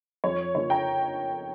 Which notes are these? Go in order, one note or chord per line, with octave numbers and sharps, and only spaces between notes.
F2 C#5
C#3 F3 A#3 C#5
G5 A#5